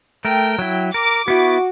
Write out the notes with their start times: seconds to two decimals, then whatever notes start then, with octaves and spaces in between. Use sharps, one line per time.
0.25 A3 A#4 G5
0.59 F#3 E4
0.94 A#4 D6
1.28 B3 E4 F#4